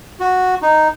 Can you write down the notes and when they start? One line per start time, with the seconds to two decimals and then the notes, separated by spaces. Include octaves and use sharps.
0.20 F#4
0.62 D#4